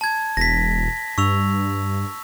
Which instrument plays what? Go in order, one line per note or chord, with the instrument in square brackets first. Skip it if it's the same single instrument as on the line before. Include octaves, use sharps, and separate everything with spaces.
[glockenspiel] A5 G#6
[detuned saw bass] E1 [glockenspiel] A#6 B6
[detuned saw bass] G2 [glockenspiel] C#6 E6 F7